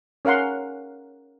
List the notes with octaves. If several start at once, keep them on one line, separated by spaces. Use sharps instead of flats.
C#4 A#4 F5 F#5 C6